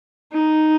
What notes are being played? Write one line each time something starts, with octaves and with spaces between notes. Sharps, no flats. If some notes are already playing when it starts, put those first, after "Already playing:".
D#4